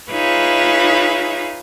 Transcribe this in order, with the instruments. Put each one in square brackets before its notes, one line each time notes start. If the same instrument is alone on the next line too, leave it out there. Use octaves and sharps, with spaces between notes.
[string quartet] D#4 F4 G#4 B4 C#5 E5